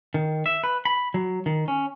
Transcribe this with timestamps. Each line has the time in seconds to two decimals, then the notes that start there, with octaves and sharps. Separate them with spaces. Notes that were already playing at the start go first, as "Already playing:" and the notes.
0.14 D#3
0.46 E5
0.64 B4
0.85 B5
1.14 F#3
1.46 D#3
1.68 C#4